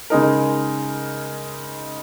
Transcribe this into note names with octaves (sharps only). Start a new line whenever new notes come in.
C#3 G#3 D#4 A#4